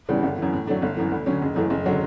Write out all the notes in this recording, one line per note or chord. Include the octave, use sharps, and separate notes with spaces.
E2 C#3 E3 G3
G1
F#2 E3
A2
F#3 A3 D4
G1
F#2 E3
D2
D3 F#3 C#4
F#1
F#2 E3 A3
F#1
D3 F#3